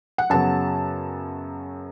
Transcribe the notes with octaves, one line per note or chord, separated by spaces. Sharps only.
F#5
F#2 C#3 F#3 B3 A5